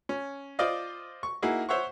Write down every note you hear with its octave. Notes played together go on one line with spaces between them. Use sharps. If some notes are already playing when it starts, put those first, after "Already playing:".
C#4
F4 C5 D5 D#5 F5
C#6
A#3 D#4 E4 F#4 G#4
C5 C#5 E5 F#5 C#6